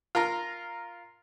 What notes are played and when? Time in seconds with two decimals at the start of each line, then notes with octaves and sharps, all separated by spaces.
0.15 F4 A#4 A#5